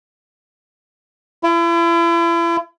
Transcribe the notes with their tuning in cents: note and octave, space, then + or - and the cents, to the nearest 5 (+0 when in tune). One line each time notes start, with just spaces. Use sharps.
E4 +40